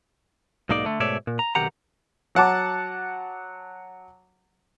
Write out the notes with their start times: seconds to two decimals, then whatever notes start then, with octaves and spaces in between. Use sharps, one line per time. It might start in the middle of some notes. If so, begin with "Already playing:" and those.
0.69 B1 G#2 A#3 D#4 D5
0.85 D3 A3
1.00 G#2 B2 A3 C#5 D5 E5
1.27 A#2
1.39 A#5
1.55 B1 C3 D#3 G4 F#5 A#5
2.35 F#3 F#5 A5 D6